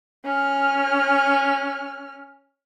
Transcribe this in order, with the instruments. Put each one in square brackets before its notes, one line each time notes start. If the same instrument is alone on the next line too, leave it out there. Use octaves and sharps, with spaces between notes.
[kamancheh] C#4 F6